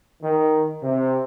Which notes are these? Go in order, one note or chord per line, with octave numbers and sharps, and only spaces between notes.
D#3
C3